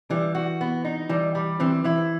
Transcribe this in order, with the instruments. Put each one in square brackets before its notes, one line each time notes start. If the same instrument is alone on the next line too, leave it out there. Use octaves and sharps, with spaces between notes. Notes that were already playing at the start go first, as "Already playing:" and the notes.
[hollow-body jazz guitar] E3 [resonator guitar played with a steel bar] G3
[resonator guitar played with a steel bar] F#4
B3
D#4
[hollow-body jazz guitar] E3 [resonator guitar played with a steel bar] G3
[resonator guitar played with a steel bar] G3
[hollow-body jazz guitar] E3 [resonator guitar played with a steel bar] C4
[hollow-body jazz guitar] E3 [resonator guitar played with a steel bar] E4